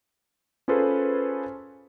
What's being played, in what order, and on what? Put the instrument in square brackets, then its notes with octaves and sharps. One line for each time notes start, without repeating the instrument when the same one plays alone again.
[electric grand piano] C#4 F4 G#4 A4 B4 C5